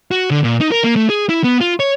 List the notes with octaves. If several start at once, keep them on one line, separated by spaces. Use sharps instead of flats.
F#4
D3
A#2
D#4
A#4
A#3
A3
G#4
E4
B3
F4
C#5